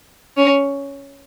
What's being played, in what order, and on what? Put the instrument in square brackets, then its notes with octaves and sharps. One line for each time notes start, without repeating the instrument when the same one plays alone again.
[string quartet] C#4